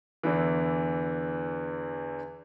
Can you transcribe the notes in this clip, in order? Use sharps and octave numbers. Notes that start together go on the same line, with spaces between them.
E2 D3 E3